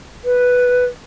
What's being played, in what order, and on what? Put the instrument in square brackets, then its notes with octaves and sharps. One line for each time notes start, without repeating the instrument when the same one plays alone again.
[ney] B4